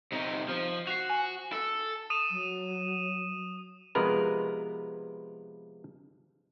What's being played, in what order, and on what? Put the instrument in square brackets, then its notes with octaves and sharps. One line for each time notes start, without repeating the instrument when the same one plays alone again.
[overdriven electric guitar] C3 D#4
F3
[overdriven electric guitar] F#4 [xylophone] C7 F7
[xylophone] G#5
[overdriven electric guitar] A4
[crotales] D#6 D#7 E7
[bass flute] F#3
[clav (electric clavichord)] C3 F3 G#3 B3 A#4 B4